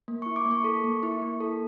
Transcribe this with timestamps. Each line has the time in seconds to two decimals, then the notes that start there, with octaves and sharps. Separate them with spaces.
0.08 A#3
0.22 E4 C#6
0.36 D6
0.46 A#3
0.51 C#6
0.64 A4
0.84 A#3
1.03 E4
1.22 A#3
1.40 A4